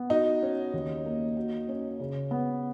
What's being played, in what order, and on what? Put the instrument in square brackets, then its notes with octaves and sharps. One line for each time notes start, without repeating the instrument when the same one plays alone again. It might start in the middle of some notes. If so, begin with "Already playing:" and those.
Already playing: [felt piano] B3
[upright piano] D#4 [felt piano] F#4
[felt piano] C#4
D#2
A#3
F#4
C#4
C#3
B3